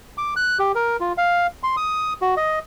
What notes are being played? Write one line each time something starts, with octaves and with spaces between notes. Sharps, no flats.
D6
F#6
G4
A#4
F4
F5
C6
D#6
F#4
D#5